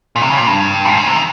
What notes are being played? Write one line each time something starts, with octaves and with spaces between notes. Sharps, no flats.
A#2
C3
C#3
A#2
G2
A#2
G#2
A#2
C3
D#3